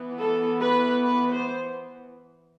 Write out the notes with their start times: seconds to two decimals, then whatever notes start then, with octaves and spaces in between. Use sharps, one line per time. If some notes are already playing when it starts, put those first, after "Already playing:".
Already playing: E3 B3
0.18 A4
0.61 B4
1.04 B4
1.32 C5